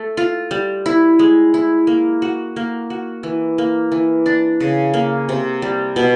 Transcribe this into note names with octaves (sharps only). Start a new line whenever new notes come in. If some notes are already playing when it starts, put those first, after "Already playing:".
Already playing: A3
F4
G3
E4
G#3
E4
A#3
F#4
A#3
F#4
E3
A#3
E3
D4
C#3
A#3
C3
G3
B2